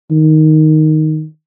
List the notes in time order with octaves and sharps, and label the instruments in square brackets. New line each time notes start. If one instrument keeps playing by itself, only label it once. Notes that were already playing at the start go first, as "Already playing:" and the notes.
[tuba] D#3